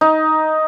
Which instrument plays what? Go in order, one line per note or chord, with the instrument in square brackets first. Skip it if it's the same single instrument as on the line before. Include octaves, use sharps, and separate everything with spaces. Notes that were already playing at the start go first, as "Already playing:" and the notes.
[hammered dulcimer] D#4